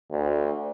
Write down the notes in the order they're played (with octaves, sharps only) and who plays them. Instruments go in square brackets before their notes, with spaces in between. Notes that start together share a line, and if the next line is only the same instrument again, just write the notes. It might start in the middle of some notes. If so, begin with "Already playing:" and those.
[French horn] D2